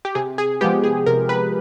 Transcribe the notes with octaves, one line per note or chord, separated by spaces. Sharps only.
G4
C3 G#4
G#4
F3 G#3 B3 G4
G#4
C3 A#4
B4